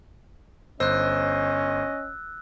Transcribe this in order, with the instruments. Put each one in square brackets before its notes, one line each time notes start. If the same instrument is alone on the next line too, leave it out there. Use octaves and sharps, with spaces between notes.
[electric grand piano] G1 C5 [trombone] C#4 [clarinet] D#5 [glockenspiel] E6 F#6